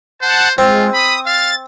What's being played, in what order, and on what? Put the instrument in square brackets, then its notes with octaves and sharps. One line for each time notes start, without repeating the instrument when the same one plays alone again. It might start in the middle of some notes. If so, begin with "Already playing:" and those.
[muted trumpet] C5 [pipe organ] F#5 A5
[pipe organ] G#3 [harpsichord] C4 [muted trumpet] F4
[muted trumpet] B5 [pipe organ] D#6
[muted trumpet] F5 [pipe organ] A6